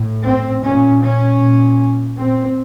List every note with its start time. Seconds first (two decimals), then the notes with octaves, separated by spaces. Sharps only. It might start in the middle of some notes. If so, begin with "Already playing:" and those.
Already playing: A2
0.23 C4
0.62 A#2 C#4
1.01 C#4
1.40 A#2
2.18 A#2 C4